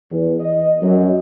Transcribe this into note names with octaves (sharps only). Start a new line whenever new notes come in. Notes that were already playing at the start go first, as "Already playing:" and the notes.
E2
D#5
F#2